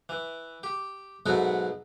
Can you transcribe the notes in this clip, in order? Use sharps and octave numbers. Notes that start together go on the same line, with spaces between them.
E3
G4
G#2 B2 F#3 A3 B3 F#4